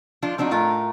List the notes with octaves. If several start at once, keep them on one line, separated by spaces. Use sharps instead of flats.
F3 D4 F4
F3 C4 D4 D#4 F#4
A2 A3 F4 A#4